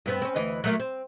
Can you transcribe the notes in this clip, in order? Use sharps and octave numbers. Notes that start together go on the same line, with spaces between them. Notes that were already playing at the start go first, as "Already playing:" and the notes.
G2 B3 C4
C4 C#4
D2 E3 D#5
F#3 A3 A#3
C4